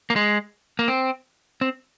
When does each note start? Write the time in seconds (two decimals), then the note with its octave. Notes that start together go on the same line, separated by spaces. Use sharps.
0.10 A#3
0.16 G#3
0.79 A#3
0.88 C4
1.61 C4